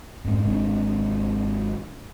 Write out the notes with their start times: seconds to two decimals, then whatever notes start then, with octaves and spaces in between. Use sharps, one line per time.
0.24 F2 G#2
0.45 G#1 C3 G#3 D4